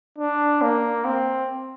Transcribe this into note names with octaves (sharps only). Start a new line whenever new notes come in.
D4
A#3
C4